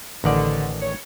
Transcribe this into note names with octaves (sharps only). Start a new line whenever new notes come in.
A1 D3 D#3 D5
C#5